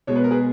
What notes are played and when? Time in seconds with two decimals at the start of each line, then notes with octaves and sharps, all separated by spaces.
0.07 B2 G#3 C#5
0.16 B4
0.24 A#4
0.31 G#4 B4